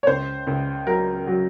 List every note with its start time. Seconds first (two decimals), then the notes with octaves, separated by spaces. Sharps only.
0.03 C#5
0.07 C#2 C5
0.47 C#2
0.86 F#3 A#4
1.27 F#3